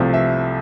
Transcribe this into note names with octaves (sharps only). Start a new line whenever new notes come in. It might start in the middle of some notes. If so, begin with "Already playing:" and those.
Already playing: C2 C3 F3 A3
E5